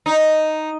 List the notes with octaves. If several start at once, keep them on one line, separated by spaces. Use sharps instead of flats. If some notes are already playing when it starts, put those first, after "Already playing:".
D#4